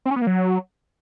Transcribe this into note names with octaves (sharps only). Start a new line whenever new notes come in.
C4
C#4
B3
A#3
F#3